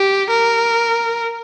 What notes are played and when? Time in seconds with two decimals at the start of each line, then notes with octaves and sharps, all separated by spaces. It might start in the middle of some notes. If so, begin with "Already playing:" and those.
Already playing: G4
0.31 A#4